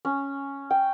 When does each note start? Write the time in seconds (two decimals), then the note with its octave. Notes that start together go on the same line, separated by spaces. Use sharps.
0.05 C#4
0.71 G5